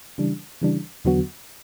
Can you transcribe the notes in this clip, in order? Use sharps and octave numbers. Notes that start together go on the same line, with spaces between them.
C#3 E3 G3 D4
C#3 E3 G3 D4
E2 D3 F#3 B3 F#4